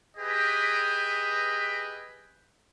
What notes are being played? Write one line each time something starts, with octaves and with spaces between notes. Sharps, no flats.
G4 G#4 B4 D#5 E5 G5